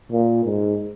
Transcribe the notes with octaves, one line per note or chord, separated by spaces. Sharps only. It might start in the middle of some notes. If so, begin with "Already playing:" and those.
A#2
G#2